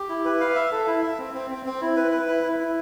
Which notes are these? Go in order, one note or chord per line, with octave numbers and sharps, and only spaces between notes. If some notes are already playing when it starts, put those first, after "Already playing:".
Already playing: G4
E4
B4
F5
E5
A4
E4
E5
C4
C4
C4
C4
E4
B4
B4
E4
E4
E4